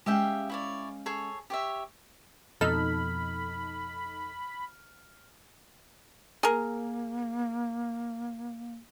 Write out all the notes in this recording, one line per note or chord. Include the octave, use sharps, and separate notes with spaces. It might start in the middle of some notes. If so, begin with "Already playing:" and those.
G#3 C#4 G4 E5 F5 G5
E4 C#5 D5
G#4 A4 C#5
G4 C#5 E5
F2 B2 D#4 A4 B5 F6
A#3 G#4 A#4